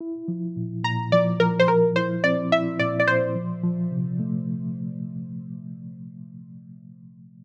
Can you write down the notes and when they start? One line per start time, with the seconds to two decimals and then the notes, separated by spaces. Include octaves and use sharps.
0.01 E4
0.28 F3
0.56 A#2
0.84 A#2 A#5
1.12 F3 D5
1.40 F3 A#4
1.60 C5
1.68 F3 A#4
1.96 E4 C5
2.24 C4 D5
2.52 E4 E5
2.79 A#2 D5
3.00 D5
3.07 A#2 C5
3.36 F3
3.63 F3
3.92 C3
4.19 A3